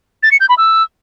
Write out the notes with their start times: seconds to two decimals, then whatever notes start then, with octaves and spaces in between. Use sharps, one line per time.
0.23 A6
0.32 C#7
0.40 G6
0.49 B5
0.58 E6